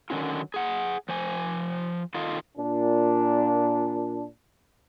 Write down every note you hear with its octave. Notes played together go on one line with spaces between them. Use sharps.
D3 D#3 F#3 C#4 F4
G#4 F#5
F3 C5 G#5
D#3 F4 A4 D#5 F5
A#2 D4